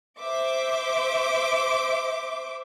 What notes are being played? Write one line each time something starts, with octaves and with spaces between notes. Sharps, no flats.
C5 E5 D6